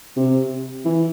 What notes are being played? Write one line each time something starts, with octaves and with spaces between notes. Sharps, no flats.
C3
E3